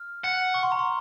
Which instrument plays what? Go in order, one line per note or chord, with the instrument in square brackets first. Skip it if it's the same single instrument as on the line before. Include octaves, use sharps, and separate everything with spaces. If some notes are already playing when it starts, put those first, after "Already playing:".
Already playing: [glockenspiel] F6
[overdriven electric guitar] F#5
[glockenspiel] C#6
C6
A#5
C6